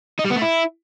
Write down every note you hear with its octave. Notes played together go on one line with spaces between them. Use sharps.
D#4
G3
B3
A3
E4